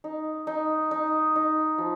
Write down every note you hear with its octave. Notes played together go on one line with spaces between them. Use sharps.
D#4
D#4
D#4
D#4
F3